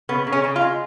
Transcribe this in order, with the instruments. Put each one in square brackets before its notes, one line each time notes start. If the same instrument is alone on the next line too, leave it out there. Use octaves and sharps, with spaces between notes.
[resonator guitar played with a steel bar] C#3 B3
C#3
C#4
C#3
F4
G#3